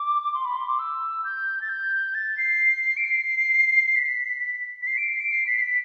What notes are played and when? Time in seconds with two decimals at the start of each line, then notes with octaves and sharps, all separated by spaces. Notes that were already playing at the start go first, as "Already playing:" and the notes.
Already playing: D6
0.34 C6
0.45 B5
0.57 C6
0.68 D6
0.79 E6
1.24 G6
1.61 A6
1.69 G6
2.15 A6
2.38 C7
2.97 D7
3.05 C7
3.96 B6
4.82 B6
4.87 C7
4.97 D7
5.09 C7
5.21 D7
5.31 C7
5.47 B6
5.58 C7
5.62 B6